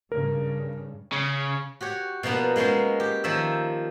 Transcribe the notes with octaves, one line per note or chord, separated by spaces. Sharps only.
G2 C#3 A#4
C#3
F#4 G4 C#5
B2 F3 A#3 B3 D4
G#3 A#3 B3 C#4 C5
G4
D#3 F3 A#3 C#5 E5